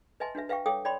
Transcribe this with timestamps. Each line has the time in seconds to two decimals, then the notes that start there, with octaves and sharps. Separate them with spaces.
0.20 B4 D#5 E5 G#5 A5 C6
0.35 D4 F#4 B4 E5
0.49 B4 E5 F5 G5 C#6
0.66 A4 C#5 F5 G5 D6 D#6
0.85 C#5 D5 G5 B5 C6